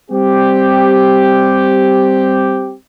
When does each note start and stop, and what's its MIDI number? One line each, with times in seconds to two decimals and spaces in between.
0.11 2.75 55
0.11 2.75 60
0.11 2.75 67